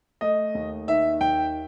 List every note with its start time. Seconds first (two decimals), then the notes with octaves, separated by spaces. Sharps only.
0.21 A3 D#5
0.55 D#2
0.88 D#3 E5
1.21 D#2 G5